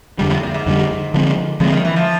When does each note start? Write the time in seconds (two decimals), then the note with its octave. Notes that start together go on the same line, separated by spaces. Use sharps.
0.19 F2 G#2 D3 G3
0.30 A2
0.43 A#2
0.54 G#2
0.66 F2 D3 G3
1.14 D3 F3 G#3 C4
1.60 A2 D3 F3 G#3 C4
1.72 D#3
1.85 E3
1.96 F3